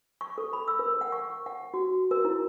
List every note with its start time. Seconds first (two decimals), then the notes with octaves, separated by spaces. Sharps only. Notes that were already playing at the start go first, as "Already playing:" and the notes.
0.21 C#6
0.38 A4
0.53 B5
0.68 E6
0.79 A#4
1.01 F#5
1.12 C#6
1.46 F#5
1.74 F#4
2.11 A#4
2.25 E4